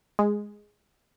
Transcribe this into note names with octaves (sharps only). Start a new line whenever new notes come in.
G#3